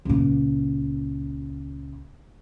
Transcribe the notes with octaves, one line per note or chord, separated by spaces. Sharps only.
C#2 A#2